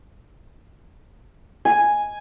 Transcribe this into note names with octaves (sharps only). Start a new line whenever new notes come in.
G#5